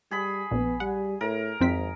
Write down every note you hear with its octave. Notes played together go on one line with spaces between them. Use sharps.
G3 G#4 B5
A#1 B3
G3 F#5
A2 A#4
G#1 F2 C4 B6